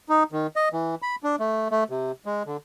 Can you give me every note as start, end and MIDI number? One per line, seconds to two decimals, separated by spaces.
0.09 0.23 63
0.32 0.47 51
0.56 0.69 75
0.73 0.95 52
1.02 1.16 83
1.23 1.36 62
1.40 1.68 57
1.71 1.84 57
1.90 2.12 48
2.26 2.43 56
2.46 2.57 50